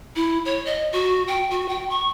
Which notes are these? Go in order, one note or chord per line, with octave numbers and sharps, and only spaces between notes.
E4
C#5
D#5
F#4
G5
F#4
G5
C#6